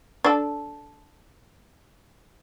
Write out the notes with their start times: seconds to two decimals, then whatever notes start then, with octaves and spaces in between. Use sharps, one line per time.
0.24 D4 A4